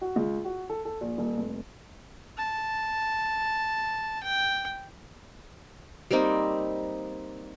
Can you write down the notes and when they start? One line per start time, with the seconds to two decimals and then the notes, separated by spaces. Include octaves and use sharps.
0.01 F#4
0.16 C#2
0.45 F#4
0.69 A4
0.85 A4
1.01 A#1
1.18 D#1
1.38 F1
2.38 A5
4.23 G5
6.11 G3 A#3 C4 D#4